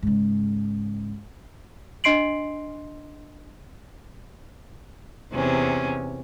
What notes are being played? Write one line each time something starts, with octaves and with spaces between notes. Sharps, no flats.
G#2 C#3
D4 D#5 C6 C7 D7 F#7
E2 C3 C#4